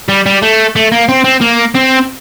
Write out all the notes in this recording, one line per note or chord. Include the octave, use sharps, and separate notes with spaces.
G3
G3
A3
A3
A#3
C4
C4
A#3
C4